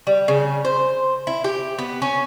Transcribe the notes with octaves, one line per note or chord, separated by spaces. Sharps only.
G3
C#3
C5
E4
G4
B3
C#4